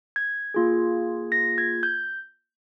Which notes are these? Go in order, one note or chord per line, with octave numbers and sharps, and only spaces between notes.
G#6
A#3 F4 G#4
A#6
G#6
G6